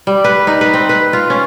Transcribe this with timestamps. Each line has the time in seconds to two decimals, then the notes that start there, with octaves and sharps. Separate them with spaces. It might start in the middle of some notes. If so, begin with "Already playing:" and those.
0.07 G3
0.24 B4
0.47 D#4
0.61 B4
0.74 C4
0.89 B4
1.13 F4
1.30 C#4